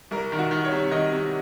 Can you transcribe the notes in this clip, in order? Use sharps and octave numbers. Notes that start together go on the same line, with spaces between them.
C2 A#4
D#3
F#4
D#3
C#5
C3
D#3 D#5
C3